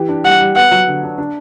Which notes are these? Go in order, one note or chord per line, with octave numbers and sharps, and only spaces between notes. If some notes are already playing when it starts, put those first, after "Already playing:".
Already playing: E3 G4
D4
G3 F#5
G3
B3 F#5
F#3
D3
D4
D4